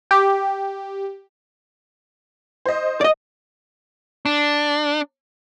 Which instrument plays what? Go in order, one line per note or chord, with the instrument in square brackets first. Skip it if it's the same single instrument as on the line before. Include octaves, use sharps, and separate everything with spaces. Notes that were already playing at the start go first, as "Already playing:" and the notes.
[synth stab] G4
[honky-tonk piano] C5 D#5
[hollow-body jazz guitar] D5 D#5
[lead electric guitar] D4